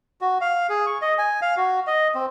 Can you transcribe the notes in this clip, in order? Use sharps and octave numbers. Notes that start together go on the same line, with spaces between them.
F#4
F5
G#4
C#6
D#5
G#5
F5
F#4
D#5
C4